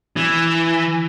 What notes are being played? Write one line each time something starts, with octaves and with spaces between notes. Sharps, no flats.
E3